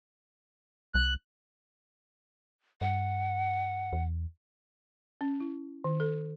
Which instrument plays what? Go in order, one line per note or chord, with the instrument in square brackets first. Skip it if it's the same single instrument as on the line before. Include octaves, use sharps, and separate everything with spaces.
[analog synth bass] C2 [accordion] F#6
[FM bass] G2 [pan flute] F#5
[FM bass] E2
[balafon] C#4
E4
D#3
A4